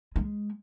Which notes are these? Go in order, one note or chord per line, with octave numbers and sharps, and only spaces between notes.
G#3